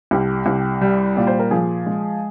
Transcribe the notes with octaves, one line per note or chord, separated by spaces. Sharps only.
C2 G4
C2
G3
A#2 D5
C5
A#4
F3 G#4
G#3